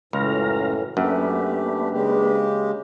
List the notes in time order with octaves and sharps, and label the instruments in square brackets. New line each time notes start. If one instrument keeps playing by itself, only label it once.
[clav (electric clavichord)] C#2 [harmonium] F#2 A2 E3 [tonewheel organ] F5 A#5
[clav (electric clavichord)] F#2 [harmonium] A3 G4 [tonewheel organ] A#3 D4 B4
[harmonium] C#3 G#3 G4